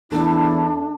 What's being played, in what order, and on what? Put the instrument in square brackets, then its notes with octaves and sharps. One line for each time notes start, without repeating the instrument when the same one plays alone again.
[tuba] E2 [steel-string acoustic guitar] A3 A4 [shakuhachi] D4 [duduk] E4